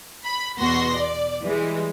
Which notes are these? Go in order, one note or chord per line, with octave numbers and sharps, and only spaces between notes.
B5
E2 B2 B3 F#4 C6 A#6
D5
E3 G3 G#3